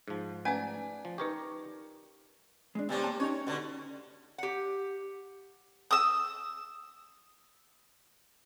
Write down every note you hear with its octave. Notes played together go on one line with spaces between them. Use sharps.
G#2 F3
A3 C#4 D4 B4 G#5
F3
D#4 G4 A#4 B4 D#5 C#6
G#3 D4
C3 G3 B3 C#4
A#3 A5
C#4 D#4 C#5
B2 D3
G4 F#5
D#6 E6